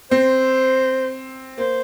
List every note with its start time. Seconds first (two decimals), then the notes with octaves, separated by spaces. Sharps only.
0.11 C4 C5
1.58 A#3 C5